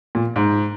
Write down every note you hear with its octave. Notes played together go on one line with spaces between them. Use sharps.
A#2
G#2